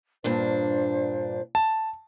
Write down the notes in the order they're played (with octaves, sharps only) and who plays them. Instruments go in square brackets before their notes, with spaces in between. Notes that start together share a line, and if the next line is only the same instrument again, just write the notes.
[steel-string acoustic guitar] G2 A#2 D4 [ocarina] C5
[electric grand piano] A5